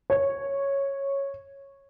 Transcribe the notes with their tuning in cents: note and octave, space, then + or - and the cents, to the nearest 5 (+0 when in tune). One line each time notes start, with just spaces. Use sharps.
C#5 -5